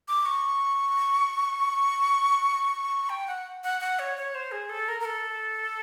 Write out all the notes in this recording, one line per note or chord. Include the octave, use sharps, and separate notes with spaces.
D6
C#6
G5
F#5
F#5
F#5
C#5
C#5
C5
G#4
A4
A#4
A#4
A4